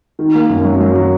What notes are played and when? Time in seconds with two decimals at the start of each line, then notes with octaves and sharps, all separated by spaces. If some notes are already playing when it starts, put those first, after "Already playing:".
0.19 D#3
0.34 A#3
0.49 F#2
0.65 F#3
0.81 F#3
0.96 F#3